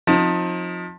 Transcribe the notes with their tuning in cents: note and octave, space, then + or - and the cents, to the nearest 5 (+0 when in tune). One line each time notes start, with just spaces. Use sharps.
F3 +30 C4 +35 D#4 +15